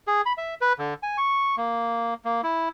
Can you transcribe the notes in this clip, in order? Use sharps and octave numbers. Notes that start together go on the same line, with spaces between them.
G#4
B5
E5
B4
D3
G#5
C#6
A#3
A#3
E4